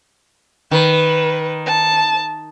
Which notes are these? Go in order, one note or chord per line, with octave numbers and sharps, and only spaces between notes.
D#3 B4
A5